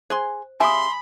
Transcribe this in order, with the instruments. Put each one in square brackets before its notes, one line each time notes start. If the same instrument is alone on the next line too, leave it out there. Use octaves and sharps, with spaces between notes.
[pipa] G#4 G#5 C6 [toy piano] C5
[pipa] C#3 G4 E5 [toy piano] G#5 D#6 [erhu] B5 [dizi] C6